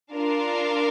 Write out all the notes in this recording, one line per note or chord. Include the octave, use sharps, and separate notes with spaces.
D4 F4 A#4 F5